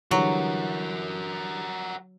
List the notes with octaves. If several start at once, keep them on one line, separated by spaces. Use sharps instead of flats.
D3 E3 F#3 G3 F#4 A#4